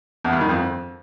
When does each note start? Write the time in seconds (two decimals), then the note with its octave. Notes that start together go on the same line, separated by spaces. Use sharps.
0.24 E2
0.33 G2
0.41 D#3
0.49 F2